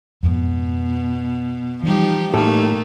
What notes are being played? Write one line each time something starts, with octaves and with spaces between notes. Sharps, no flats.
F2 G#2 B2
E3 F3 G3 D#4 G4
A2 A3 A#3 D#4 G4 A4